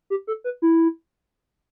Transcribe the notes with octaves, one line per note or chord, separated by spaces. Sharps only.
G4
A4
B4
E4